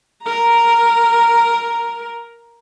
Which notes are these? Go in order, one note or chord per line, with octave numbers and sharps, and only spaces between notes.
A#4 A#5